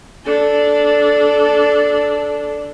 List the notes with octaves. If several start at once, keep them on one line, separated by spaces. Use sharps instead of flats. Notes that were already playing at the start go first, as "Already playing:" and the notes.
D4 A4